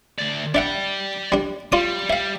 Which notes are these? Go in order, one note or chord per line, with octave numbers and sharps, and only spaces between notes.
D2 D5
D4 D5 E5 F#5 G5
G3 D4
G3 F4 D5 D#6
G3 E5 F5